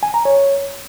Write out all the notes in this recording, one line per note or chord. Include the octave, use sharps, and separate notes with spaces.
G#5
A#5
C#5